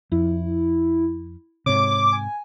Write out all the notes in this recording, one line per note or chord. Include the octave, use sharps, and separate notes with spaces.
F2 E4
G#2 C3 C#5 D6
G#5